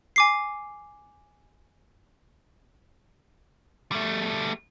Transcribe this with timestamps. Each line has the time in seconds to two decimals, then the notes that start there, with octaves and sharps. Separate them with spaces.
0.16 G#5 D6 C7
3.92 G3 A3